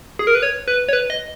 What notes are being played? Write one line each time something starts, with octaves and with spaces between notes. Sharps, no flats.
G#4
A#4
B4
C#5
B4
C#5
B4
D#5